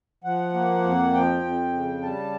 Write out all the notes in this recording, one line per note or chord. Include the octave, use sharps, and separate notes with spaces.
F3 F#5
A#3
F2
F3 G5
F2
C#3
G3 A5